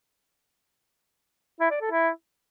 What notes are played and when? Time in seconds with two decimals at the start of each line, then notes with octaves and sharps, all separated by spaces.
1.61 E4
1.71 D5
1.81 A4
1.91 E4